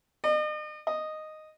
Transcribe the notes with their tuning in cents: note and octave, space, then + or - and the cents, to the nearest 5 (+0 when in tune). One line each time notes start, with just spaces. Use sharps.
D#5 -40
D#5 -5